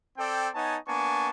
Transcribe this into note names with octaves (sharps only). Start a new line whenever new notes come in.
C4 A4 D5 G5
B3 D#4 C#5 F#5 G#5 A5
A#3 B3 D4 G#5 A5 C#6